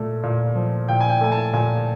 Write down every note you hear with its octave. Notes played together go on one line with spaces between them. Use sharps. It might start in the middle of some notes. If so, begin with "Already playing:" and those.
Already playing: A#2 A3
A#2
F3
A#2 G5
G#5
G5
A3 G#5
A5
A#2 G#5